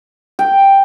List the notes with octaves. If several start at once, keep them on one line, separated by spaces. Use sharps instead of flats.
G5